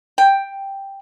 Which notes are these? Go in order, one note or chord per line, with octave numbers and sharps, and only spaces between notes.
G5